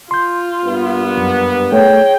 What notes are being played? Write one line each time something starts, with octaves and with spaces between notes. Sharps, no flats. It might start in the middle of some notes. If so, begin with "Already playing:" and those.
F4 C6 G6
G2 A#3 B3
F#2
A3 G#4 C#5 G5